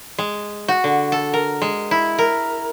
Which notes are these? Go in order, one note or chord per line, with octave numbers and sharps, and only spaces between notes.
G#3
F#4
D3
A4
A#4
G#3
E4
A#4